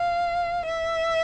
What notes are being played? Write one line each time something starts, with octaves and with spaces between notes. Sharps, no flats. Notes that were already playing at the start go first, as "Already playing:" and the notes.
Already playing: F5
E5